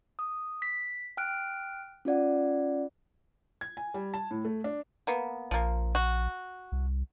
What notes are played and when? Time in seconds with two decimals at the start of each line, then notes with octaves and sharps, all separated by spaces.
0.19 D#6
0.62 B6
1.17 G5 F6 F#6 D7
2.05 C#4 F4 D5 F#5
3.61 G#6
3.77 G#5
3.94 G3
4.14 A5
4.31 A2
4.45 A3
4.64 D4
5.07 A#3 B3
5.51 A#1 F3 A#3
5.95 F#4
6.72 C2